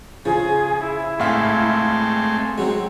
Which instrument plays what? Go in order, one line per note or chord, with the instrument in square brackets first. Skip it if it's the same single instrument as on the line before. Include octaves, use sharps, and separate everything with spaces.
[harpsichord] C#3 [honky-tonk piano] F3 [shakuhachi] G#4
[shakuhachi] E4
[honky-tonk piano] A2 F5 B6 [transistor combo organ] G#3 A3 C4
[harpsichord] F#3 G#3 [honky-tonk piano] C4 F#4